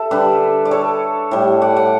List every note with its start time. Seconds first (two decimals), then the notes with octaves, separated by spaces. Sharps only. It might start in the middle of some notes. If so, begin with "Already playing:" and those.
Already playing: A4 E5
0.11 D3 G3 B4 D5
0.65 D5
0.71 A4 C#5
1.31 A2 G3
1.62 D5 F#5
1.77 D5 F#5